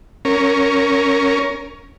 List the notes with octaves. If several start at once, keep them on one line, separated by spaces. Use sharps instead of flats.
C#4 A#4